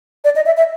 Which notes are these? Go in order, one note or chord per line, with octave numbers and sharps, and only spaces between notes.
D5
D#5
E5
E5